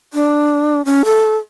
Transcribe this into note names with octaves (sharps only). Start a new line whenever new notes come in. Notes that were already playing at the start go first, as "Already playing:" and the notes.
D4
C#4
A4